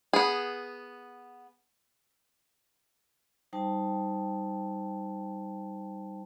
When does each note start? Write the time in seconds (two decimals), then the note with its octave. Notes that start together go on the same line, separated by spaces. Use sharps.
0.13 B3 G#4
3.53 G3 D#4 C5 G5 A5